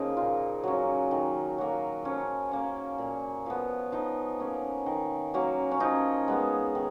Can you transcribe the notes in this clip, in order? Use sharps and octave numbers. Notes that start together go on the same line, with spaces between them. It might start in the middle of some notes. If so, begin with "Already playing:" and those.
Already playing: C#3 F3 A#3 D#4
A#2 F4
F#3 C#4
D#3
F#3 A#3
F3 C#4
A#3 C#4
A#2
F3 B3
F3 D#4
A#3 C#4
D#3
F#3 A#3 C#4
C#4
F3 D#4
G#3 B3
D#3